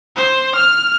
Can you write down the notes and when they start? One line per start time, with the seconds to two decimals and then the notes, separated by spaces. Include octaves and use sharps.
0.17 C5
0.56 F6